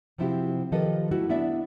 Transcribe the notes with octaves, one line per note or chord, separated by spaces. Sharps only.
C3 F3 C4 E4 F#4 G4
D#3 F3 G4 A4 B4 D#5
A3 E4 F#4
B3 D4 E4 D5 E5